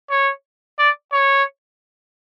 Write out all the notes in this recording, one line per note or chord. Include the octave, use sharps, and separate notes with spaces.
C#5
D5
C#5